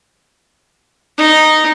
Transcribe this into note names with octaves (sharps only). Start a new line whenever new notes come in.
D#4